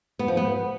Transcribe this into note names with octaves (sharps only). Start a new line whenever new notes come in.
B3
F3
B3